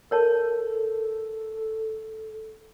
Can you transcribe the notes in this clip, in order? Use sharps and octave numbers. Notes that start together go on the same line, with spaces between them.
A4 A#4 C#5 A5